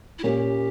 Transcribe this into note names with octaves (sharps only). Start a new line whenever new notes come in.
E4
A#2 A#3 C#4 G4